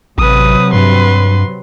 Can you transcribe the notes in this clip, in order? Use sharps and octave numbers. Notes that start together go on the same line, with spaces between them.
A1 C3 F#3 B4 D#6
G2 B4 C6